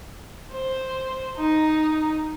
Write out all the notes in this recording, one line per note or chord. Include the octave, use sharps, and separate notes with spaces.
C5
D#4